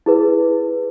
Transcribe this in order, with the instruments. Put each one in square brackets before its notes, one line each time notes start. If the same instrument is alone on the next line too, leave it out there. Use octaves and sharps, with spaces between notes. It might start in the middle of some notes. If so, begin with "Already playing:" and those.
[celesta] E4 G#4 B4